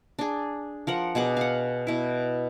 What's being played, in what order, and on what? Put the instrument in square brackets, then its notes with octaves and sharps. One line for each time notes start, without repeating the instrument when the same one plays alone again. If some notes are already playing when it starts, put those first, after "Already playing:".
[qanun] D4 G#4
F3 A#4 F#5
B2 G#4 F#5 D6
F5 F#5
B2 E4